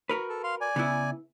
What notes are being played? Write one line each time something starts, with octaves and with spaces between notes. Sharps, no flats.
F#4 A#4 B4
A4
F5 C6
D5 G#5
C#3 B3 E4